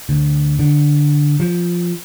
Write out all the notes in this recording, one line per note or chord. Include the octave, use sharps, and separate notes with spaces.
D2
D3
F3